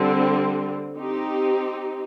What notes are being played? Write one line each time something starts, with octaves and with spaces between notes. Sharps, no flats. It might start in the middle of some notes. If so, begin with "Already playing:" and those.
Already playing: D3 G3 C4
C4 D#4 G4